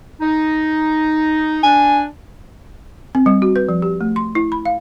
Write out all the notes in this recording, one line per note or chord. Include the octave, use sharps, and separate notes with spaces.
D#4
D4 G#5
C4
G3
F#4
B4
F3
G4
A3
C6
E4
B5
F5